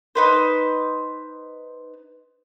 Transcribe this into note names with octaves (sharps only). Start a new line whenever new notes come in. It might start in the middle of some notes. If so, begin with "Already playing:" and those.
D#4 B4 C5